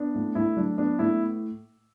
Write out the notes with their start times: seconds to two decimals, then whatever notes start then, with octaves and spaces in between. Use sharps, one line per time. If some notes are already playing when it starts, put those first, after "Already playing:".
Already playing: B3 D4
0.15 A2
0.35 A2 E4
0.56 F#3 D4
0.78 B3 D4
0.99 A2 E4